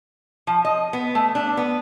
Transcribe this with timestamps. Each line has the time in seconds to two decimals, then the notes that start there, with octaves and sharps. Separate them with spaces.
0.47 F3
0.65 D#5
0.93 B3
1.15 A3
1.35 D4
1.57 B3